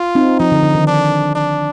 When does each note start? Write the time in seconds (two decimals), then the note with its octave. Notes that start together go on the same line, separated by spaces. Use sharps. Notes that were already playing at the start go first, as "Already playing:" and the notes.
Already playing: F4
0.15 C4 D#4
0.40 F3 D#4
0.52 D3
0.63 D3
0.75 D#3
0.87 D4
1.35 D4